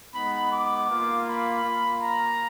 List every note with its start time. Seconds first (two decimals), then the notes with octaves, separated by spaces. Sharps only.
0.14 G#3 B3 D#4 B5
0.51 D6
0.89 A#3 F4
1.27 B5
1.64 A#3 F4
2.02 A#5